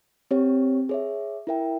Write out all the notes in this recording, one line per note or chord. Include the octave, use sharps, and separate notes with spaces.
C4 G4 C#5
G#4 C#5 E5
E4 A#4 E5 G5